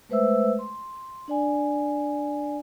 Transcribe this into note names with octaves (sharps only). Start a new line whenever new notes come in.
G#3 A3 B4 C5 E5 E6
C6
D4 D5 G#5